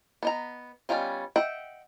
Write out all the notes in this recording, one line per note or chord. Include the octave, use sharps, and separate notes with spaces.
B3 D#5 A#5
G3 B3 C#4 F4 D#5
D#5 E5 F#5 G5